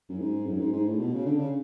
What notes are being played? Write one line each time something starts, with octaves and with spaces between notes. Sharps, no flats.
F#2
G#2
F#2
G#2
G#2
A2
B2
C#3
D3
C#3